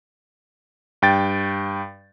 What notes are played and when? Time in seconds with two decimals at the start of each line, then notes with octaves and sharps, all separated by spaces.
1.02 G2 G5 A6